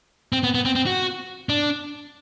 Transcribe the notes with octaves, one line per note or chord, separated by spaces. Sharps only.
C4
B3
B3
C4
C4
F#4
D4